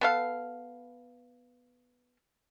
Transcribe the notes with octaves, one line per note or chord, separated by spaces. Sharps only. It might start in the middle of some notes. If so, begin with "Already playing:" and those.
B3 A4 F5